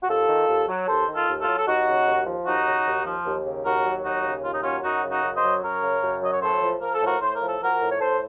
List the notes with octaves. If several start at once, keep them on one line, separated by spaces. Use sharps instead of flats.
F#4
D#2 F4 A4
D#3
D#2
F#3
D#2 A4 C5
D#3
F4 A4
D#2
F4 A4
F#3
A4
D#2 D#4 F#4
C#3
D#2
F3
D#2 D#4 F#4
C#3
D#2
F3
D#2
C#3
D#2 F#4 A#4
F#3
D#2 D#4 F#4
C#3
D#2 F4
D#4
F#3 C#4 F4
F#2 D#4 F#4
C#3
D#4 F#4
F#2
C5 D#5
F#3
F#2 A#4 C#5
C#3
F#2
F#3 D#5
C#5
A2 A4 C5
F3
F3 A#4
A4
A2 F#4 A#4
A2 C5
A#4
F3
A4
F3 F#4 A#4
A2
C#5
A2 A4 C5